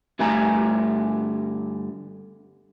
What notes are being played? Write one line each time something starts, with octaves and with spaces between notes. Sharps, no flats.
G2 D3 A3 E5 G#5 A#5